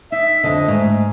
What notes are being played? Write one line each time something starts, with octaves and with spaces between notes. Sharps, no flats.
D#4 E5
F2 G#2 D3 D#5
G#2 A3